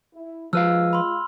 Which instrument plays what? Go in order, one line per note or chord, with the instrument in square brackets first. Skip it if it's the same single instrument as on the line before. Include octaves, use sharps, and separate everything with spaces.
[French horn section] E4
[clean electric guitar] F3 B4 F5 [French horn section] G#3 F4 [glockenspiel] E6 F6
[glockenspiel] B5 C6